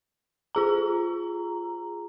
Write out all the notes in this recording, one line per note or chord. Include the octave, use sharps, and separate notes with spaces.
F4 G#4 A#5